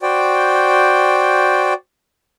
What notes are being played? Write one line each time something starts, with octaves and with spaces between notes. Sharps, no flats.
F#4 C5 D5 G5